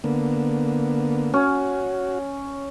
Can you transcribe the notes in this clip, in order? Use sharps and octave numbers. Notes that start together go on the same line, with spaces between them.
D3 A#3 B3
C#4 F#4